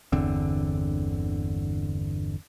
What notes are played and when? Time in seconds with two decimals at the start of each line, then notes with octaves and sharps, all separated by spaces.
0.12 G1 E2 D3 C4